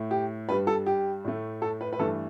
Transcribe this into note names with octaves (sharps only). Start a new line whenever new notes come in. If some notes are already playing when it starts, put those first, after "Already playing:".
Already playing: A2 A3
G4
G2 G3 B4
A4
G4
A2 A3
A4
B4
B4
G2 E3 A3 A4